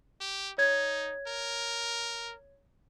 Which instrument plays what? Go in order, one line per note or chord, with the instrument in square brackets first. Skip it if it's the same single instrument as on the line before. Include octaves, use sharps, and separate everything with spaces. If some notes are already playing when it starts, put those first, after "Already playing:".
[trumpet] G4
[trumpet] D#4 [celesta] C#5 G#6
[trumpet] A#4